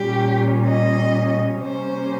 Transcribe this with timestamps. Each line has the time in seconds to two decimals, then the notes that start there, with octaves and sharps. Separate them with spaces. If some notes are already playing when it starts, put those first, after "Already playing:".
Already playing: A#2 G3 C#4 G4
0.67 D#5
1.62 C3 G3 A#3 C#4 C5